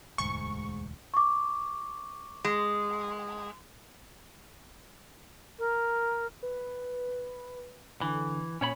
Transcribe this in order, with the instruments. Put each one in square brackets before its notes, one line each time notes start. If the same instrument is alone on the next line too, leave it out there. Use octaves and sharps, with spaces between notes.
[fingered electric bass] E1 D2 [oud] G#2 [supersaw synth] C#6
[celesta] C#6 D6
[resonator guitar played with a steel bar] G#3
[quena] A#4
[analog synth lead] B4
[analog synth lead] D3 [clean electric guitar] E3
[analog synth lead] A#2 [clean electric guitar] C#4 C#5 B5